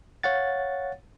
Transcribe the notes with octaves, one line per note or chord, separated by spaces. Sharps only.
C#5 F5 F#5 A6